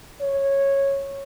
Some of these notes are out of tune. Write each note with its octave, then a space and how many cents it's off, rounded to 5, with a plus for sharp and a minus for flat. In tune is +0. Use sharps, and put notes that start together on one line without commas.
C#5 -10